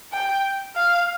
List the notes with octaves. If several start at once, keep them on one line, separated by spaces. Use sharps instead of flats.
G5
F5